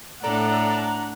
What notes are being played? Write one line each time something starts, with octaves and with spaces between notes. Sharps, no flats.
A2 D4 A4 D5 F#5 A#5